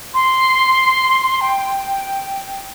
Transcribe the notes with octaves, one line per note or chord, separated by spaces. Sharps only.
C6
G5